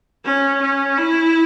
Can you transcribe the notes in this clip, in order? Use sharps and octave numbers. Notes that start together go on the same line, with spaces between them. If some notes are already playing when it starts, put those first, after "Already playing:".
C#4
C#4
E4